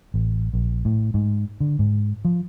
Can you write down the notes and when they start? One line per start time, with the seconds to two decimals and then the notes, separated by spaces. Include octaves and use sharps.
0.14 A1
0.54 A#1
0.85 A2
1.14 G#2
1.60 D3
1.79 G#2
2.25 F3